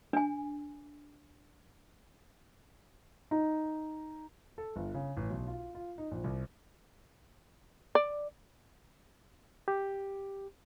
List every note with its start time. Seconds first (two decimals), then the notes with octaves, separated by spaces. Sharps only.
0.13 D4 G#5
3.31 D#4
4.58 A4
4.76 G1
4.94 C#3
5.17 A1
5.30 B1
5.47 F4
5.75 F4
5.98 D#4
6.11 A#1
6.24 C2
7.95 D5
9.68 G4